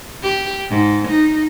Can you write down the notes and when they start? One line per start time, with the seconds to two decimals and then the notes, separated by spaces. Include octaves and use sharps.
0.23 G4
0.70 G#2
1.09 D#4